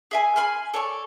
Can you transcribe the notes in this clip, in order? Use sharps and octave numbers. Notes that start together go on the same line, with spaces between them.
G#4 E5 G#5
G#5 B5 C6 F6
A4 C#5 D5 C#6